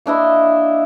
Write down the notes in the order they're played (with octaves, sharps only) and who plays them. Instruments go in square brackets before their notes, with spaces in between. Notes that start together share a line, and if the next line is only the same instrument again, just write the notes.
[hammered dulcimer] A#3 D4 E4 D#5